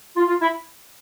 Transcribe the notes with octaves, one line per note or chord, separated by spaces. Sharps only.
F4
F4
E4